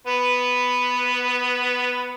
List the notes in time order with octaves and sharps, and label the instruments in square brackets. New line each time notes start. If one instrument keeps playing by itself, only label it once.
[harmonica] B3 B4